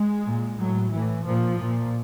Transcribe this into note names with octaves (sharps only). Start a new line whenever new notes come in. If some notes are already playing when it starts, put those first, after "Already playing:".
Already playing: G#3
A#2
A2 F#3
A2 E3
A#2 F3
A#2